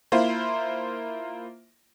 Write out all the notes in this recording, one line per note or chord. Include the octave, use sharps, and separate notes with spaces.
A#3 E4 F4 C5